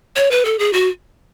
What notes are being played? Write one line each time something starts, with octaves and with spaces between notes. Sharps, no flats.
C#5
B4
A4
G#4
F#4